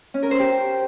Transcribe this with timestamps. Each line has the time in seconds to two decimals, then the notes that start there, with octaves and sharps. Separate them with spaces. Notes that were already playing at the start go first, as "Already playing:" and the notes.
0.14 C#4
0.23 A#4
0.31 C5
0.39 G4